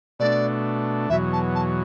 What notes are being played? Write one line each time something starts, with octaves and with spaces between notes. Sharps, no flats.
B2 A3 D4 D5
E2 B2 F#3 E5
A5
A5